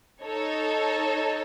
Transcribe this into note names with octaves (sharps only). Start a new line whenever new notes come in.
D#4 A4 C#5